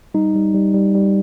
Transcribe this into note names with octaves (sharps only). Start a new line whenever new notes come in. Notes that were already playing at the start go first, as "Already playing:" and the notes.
G3 D#4
G3
G3
G3
G3